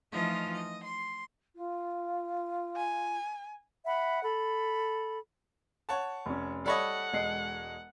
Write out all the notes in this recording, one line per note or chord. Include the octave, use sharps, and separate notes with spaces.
E3 F3 A3 D#4 F4 D#5
D#5
C6
F4
G#5
E5 F#5 B5
A4 B5
C#5 F#5 A5
F1 C#4
G3 A4 C#5 D#5 F#5 B5
E1 G#3 C7